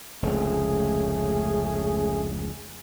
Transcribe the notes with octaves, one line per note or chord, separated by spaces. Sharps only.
F1 C#2 A3 C#4 G#4